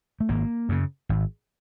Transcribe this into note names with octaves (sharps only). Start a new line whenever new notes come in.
A3
G#1 A#3
F#2 C#3
G#1